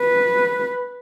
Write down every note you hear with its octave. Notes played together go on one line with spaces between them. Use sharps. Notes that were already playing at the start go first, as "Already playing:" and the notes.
Already playing: B4